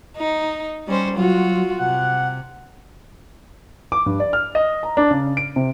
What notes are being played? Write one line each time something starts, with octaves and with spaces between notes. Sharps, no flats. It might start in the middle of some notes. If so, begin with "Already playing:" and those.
D#4
G3 C#4 C5
F#3 F4 F#4
C3 F#5
D6
G2
D5
F6
D#5
A#5
D4
C#3
D7
C3